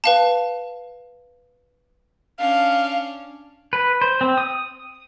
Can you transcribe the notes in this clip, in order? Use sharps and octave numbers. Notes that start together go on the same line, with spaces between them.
B4 F5 A5
C#4 D4 F5
B4
C5
C4
D#6